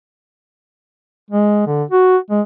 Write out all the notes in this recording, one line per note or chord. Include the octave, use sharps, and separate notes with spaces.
G#3
D3
F#4
G#3